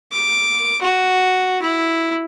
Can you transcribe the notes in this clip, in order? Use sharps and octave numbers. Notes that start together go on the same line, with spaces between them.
D6
F#4
E4